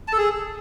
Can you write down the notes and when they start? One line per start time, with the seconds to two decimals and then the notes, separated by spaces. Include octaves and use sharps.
0.08 A5
0.13 A4
0.18 G#4